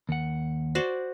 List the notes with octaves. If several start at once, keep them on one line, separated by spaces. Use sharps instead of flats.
D#2 F#5
F#4 C5 D5